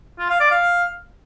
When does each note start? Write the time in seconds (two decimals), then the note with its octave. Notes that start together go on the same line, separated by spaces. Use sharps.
0.19 F4
0.29 F5
0.40 D5
0.51 F5